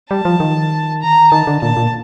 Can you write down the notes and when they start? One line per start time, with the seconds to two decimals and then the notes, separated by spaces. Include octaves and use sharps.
0.11 G3 A5
0.25 F3
0.40 D#3
1.02 A#5
1.32 D#3 A5
1.47 D3
1.62 A#2 A5
1.77 A#2